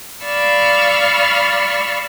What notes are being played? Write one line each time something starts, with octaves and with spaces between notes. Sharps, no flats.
D5 F5 B5 C#6 E6 F6